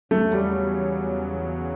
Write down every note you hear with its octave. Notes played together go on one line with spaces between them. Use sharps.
E2 C#3 F#3 A3
G3